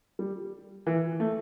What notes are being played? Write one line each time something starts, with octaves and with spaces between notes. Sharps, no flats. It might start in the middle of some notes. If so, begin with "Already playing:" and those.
G3
E3
A3